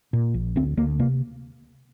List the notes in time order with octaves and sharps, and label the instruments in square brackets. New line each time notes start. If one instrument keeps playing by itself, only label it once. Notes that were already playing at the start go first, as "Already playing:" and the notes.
[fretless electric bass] A#2
A#1
D2 C4
D2 A#3
C3 A#3